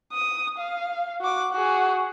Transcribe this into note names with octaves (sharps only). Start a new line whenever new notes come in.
D#6
F5
F#4 D6
F#4 G#4